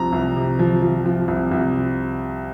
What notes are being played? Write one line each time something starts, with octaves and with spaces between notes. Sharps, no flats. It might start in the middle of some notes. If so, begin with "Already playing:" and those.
Already playing: C2 C3 F3 A#5
C2
C3
F3
F3
F3
C2
C2